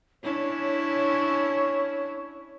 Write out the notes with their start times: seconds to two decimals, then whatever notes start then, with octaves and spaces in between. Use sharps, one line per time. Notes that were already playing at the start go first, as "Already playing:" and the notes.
0.23 C#4 D4 E4 C#5